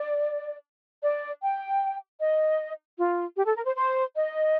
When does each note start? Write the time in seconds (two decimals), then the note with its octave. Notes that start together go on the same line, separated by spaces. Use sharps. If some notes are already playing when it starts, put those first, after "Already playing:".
Already playing: D5
1.02 D5
1.41 G5
2.18 D#5
2.97 F4
3.36 G4
3.45 A4
3.55 A#4
3.65 C5
3.75 C5
4.14 D#5